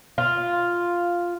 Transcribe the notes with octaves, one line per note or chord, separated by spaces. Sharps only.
F4